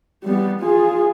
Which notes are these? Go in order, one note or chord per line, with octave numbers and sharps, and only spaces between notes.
G3 B3
F4 G#4